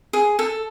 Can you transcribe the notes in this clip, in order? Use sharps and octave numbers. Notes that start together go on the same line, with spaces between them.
G#4
A4